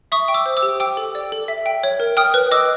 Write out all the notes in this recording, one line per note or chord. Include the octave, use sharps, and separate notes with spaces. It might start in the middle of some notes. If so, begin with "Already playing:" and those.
E5 C#6 D#6
G5
D6 E6
C5
D6 E6
G4
G5 D6 E6
A4
D5
A4
E5
G5
C#5
A#4
G5 D#6 F6
B4
D#5 D6 E6